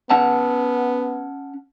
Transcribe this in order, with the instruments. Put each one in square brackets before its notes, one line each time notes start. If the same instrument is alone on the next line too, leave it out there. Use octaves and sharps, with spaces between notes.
[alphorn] B3 [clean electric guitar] C#4 F#5 A5